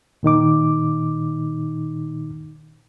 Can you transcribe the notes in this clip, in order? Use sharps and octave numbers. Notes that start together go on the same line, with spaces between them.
A#2 D#3 D#4 D6